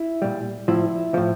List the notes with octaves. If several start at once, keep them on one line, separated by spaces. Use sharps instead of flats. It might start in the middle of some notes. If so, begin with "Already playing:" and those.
Already playing: E4
A#2 G3
A2 F3 E4
A2 F3